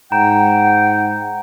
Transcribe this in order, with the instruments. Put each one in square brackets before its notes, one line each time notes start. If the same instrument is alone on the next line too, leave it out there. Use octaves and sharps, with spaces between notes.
[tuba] G#2 [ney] F#5 [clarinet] G5 [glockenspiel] A#5